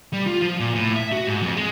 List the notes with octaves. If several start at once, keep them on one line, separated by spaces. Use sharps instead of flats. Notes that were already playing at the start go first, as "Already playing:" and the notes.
G3
F4
F3
A#2
A2
E5
F#4
G#2
F2
G#3